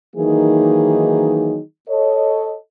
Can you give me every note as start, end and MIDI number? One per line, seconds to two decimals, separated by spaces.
0.16 1.59 51
0.16 1.59 52
0.16 1.59 54
0.16 1.59 58
0.16 1.59 63
0.16 1.59 68
1.89 2.55 69
1.89 2.55 73
1.89 2.55 75